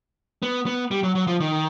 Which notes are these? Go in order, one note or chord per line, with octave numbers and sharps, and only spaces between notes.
B3
B3
G3
F#3
F#3
F3
D#3